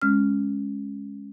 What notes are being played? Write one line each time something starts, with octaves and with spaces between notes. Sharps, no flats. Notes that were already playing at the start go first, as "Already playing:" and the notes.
G#3 C#4 F6